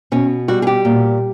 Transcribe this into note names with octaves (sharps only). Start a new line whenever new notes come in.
B2 C#4
G3 F#4
G#4
G4
A#2